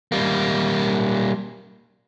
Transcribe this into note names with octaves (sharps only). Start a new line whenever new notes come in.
G3 A#3